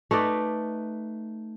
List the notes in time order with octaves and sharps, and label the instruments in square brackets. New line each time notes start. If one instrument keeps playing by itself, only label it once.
[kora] A3 D#4 B4 D5